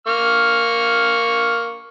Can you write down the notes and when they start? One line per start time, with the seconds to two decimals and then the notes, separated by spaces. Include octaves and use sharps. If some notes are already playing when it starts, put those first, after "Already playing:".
0.07 A#3 C#6 F6